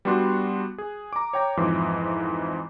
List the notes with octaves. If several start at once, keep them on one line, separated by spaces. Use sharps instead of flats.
G3 B3 D4 F#4 C6 F#6
G#4
A#5 D6
C#5 G5 A#5
F2 G#2 E3 F3